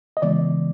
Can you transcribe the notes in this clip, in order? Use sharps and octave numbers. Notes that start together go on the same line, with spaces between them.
D#5
C#3 E3 G#3 B3 D5